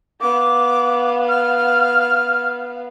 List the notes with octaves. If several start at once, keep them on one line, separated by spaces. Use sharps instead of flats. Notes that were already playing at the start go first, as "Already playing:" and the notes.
B3 F5 D6
F6